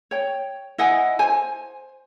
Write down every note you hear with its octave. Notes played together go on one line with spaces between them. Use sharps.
C#5 G5
E4 D#5 F#5 G#5
C5 G#5